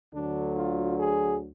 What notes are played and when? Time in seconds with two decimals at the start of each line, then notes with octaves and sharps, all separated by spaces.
0.12 D2 D3 F#3 D4
0.55 F4
0.98 G#4